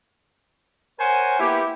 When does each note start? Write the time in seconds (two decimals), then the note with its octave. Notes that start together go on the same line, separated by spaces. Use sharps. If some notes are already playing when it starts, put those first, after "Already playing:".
0.99 A#4 C5 C#5 F#5 G#5
1.40 A#3 B3 E4 G4